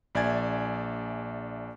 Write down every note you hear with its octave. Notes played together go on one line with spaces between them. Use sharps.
A#1 D5 E5 G#5 G#6 A6